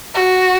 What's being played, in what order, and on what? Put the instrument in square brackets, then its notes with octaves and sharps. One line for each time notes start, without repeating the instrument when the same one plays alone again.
[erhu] F#4